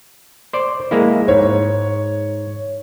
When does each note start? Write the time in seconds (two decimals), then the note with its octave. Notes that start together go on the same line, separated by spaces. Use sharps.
0.53 C5 D5
0.91 G#3 A#3 E4
1.28 G#2 C#5